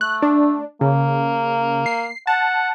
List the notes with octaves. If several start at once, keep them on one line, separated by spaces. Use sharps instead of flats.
A3 F#6
D4
C#3 A#3
C7
F#5 A5